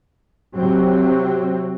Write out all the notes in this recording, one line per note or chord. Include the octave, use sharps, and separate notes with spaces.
C3 F#3 C4